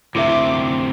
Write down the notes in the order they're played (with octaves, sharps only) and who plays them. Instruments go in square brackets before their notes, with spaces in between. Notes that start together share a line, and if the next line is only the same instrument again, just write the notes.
[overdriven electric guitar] D2 C3 [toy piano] E4 A#4 E5 [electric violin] D6